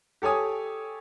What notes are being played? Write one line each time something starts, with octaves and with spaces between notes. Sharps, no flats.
G4 A4 C#5 G#5 D#6